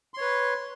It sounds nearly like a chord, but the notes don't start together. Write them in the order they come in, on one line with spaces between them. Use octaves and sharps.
C6 C#5 B4